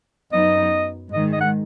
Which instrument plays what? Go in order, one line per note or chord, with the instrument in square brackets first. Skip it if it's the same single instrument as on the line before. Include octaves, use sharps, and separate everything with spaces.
[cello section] F#2 F#3 B3 D#4 [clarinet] D#5
[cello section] G#2 D#3 G#3 [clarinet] D#5
[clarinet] D#5
F#5